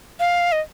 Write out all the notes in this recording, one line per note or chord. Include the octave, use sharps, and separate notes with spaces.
F5
D#5